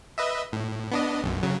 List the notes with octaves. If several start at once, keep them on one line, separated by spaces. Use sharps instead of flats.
B4 D#5 E5
A2
B3 D4 D#5
B1 F#2
C#3 F#3